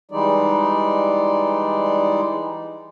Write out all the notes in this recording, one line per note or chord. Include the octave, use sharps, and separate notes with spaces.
E3 G3 G#3 D#4 D5